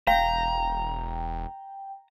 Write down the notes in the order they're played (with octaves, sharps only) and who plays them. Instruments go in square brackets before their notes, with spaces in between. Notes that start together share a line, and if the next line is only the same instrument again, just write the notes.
[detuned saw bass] E1 [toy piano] F5 [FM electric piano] G5 [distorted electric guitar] A#5